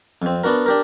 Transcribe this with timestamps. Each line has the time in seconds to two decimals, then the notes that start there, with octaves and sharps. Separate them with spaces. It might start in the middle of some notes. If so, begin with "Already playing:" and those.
0.22 F2 C4
0.44 B3 D4 F#4 A#4
0.66 D4 G4 A#4